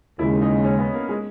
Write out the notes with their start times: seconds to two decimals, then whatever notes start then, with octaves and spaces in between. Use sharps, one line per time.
0.19 D#2 C#3 G#3 E4
0.42 D#4
0.64 C#4
0.79 B3
0.94 A#3
1.09 G#3